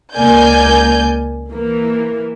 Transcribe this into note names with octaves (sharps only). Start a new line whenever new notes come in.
C#2 A#3 D5 G#5 G6
E3 A#3